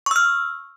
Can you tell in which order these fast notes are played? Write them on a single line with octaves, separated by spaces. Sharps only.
C#6 E6 F6